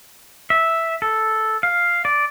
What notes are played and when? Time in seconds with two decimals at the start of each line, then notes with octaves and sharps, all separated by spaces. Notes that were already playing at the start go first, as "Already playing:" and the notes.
0.50 E5
1.02 A4
1.63 F5
2.05 D5